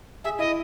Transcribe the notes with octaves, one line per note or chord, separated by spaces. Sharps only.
G#4 E5
E4 D#5